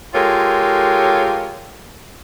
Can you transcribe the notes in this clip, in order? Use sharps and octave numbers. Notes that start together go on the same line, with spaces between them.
G#3 F4 G4 A4 A#4 C#5